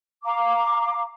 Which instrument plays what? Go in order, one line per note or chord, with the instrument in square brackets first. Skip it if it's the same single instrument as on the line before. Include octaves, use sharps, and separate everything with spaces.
[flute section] F5 A#5 D6